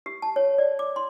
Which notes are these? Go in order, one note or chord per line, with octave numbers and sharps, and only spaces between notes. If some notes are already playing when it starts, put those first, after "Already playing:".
G4
A5
C#5
D5
D6
C6